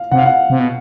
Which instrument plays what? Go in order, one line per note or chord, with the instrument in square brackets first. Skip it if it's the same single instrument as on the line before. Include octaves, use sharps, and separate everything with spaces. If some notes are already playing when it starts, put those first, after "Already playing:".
Already playing: [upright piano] F5
[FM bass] C3 [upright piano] F#5
[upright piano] F5
F#5
[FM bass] C3
B2